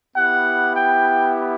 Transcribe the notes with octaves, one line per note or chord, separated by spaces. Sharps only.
B3 E4 G4 F#5
G5